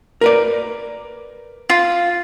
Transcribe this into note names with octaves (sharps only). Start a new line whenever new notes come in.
A#4 B4 D5
F4